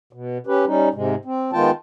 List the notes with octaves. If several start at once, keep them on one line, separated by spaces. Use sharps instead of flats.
B2
C#4 G4 B4
G3 C#4 D#4
G#2 C3 G#3
C4
D#3 G#3 B3 F4 G5 A5